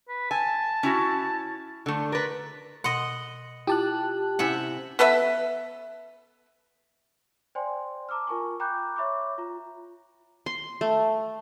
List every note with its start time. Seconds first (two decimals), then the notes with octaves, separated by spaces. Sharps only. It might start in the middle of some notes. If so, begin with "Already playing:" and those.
0.08 B4
0.31 G#5 A5
0.83 C#4 E4 F#4
1.86 D3 A3
2.12 A#4 B4 D5
2.84 B2 D#5 F#5 C6
3.67 E4 F4 G4 A5 F#6
4.39 C3 C#4 E4 E5 F#5 G#5
4.99 B3 A4 B4 E5
7.55 C5 D5 G5 G#5 C6
8.09 A5 A#5 D6 E6 F6
8.27 F4 A#4 G#5 A5 C#6
8.60 G5 A#5 B5 D6 F#6 G6
8.96 C#5 E5 B5 C#6 D6
9.38 F4 A#5
10.46 C6
10.81 A3